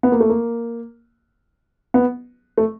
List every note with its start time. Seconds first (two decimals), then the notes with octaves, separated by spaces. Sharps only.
0.03 B3
0.12 A#3
0.20 A3
0.29 A#3
1.94 B3
2.58 A3